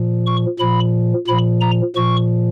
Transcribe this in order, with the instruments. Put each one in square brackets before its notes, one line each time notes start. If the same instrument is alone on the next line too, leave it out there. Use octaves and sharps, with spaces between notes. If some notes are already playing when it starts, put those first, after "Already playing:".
Already playing: [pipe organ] A#2 F3
C#6
A#2 F3 B5
A#2 F3 B5
A#5
A#2 F3 C#6